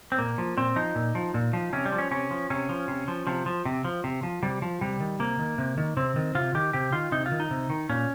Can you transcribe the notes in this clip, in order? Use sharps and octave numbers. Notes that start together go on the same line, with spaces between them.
C4
A#2 A#3
F3
A#2 C4
F3 D#4
A#2
F3
A#2
F3
C3 C#4
G3
F3
C#4
C3 C#4
F3
C3 C#4
F3
C3
F3
C3 F3
F3
C3
F3
C3
F3
C3 G3
F3
C3 G3
D#3
C3 A#3
D#3
C3
D#3
C3 C4
D#3
C3 F4
D#3 G4
C3 G4
D#3 F4
C3 D#4
F4
D#3
D#4
C3
D#3
A#2 C#4